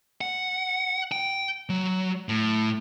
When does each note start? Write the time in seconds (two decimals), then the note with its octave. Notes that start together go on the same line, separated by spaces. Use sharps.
0.21 F#5
1.12 G5
1.69 F#3
2.29 A2